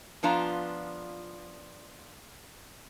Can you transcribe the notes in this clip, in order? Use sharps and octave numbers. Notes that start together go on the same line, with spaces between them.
F3 B3 D4 F4 A#5